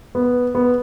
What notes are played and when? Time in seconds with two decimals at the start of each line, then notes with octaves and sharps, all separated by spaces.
0.15 B3
0.55 B3